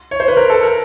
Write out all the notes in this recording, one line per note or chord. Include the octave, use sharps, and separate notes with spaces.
C#5
C5
B4
A#4
A4
A#4